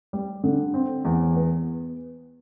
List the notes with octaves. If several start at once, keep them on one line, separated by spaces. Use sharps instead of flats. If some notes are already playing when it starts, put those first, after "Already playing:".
G3
D3
C4
E2
B3